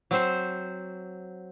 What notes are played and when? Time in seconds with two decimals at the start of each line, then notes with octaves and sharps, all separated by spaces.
0.11 F#3 C4 C5